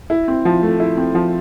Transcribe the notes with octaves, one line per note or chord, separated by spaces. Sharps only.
E4
C4
F3
A3
E4
C4
F3